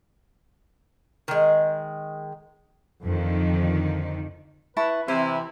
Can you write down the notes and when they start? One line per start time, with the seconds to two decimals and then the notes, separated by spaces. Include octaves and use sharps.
1.28 D#3 G#3
3.03 F2 D3 D#3 F3
4.77 E4 B4 A5 C#6
5.08 C3 E3 E4 C6